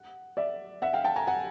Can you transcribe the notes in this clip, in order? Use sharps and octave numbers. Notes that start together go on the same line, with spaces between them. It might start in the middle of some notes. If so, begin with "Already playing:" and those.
Already playing: F#5
D5 E5
E5 F#5
F5 G5
G5 A5
G#5 A#5
F#5 G#5